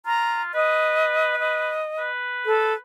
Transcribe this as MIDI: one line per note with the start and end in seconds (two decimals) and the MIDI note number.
0.06 0.53 65
0.06 0.42 82
0.54 1.80 71
0.54 1.39 75
1.40 2.09 75
1.98 2.78 71
2.46 2.73 69